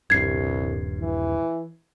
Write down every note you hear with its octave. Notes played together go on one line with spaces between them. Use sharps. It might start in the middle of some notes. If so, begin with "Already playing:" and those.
D#1 C2 G2 G#6 C7
E3